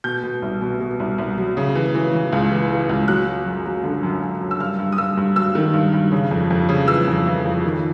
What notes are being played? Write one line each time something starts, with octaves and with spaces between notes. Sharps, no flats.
B2 G6
B2
C2
B2
B2
C2
C2
F#3
C#3
E3
E3
E3
C#2
E3
E3
C#2
F#3 F#6
F#3
F#2
F#3
D3
F#2
F#2
F#2
E6
G2 F6
G2
D#6
G2 E6
G2
F#3 E6
D#3
G2
G2
C#3
F2
F2
C#3
E3 E6
F2
E3
F2
D#3